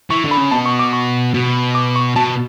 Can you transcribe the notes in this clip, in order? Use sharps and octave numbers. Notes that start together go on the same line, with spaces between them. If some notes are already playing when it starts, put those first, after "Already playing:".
E3 C#6
D3
B5
C#3
B2 A5
C#6
D6
C#6
B2
D6
C#6
B2 A5